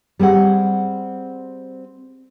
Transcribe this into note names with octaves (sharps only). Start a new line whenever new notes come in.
G3 C4 G#4 F#5